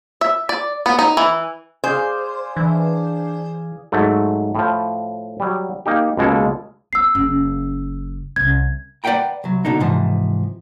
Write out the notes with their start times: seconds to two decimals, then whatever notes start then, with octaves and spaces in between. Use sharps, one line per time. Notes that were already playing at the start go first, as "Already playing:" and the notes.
0.21 E5
0.49 D5
0.86 B3
0.99 D#4
1.17 E3
1.84 G#4 C5 D5 F5
2.57 E3 D4
3.92 G#2 F#3 A3
4.55 A2 F3
5.40 F#3 G3
5.86 A#3 D#4 G4
6.17 C#2 B2 G#3 A#3 A4
6.93 B3 E6 C7
7.15 F#1 C#4
8.36 C2 C#4 G#6
9.04 B4 D5 E5 F#5 G5 A#5
9.44 C2 F#3
9.65 B2 D3 D#4
9.80 G#2 C3 E3 F3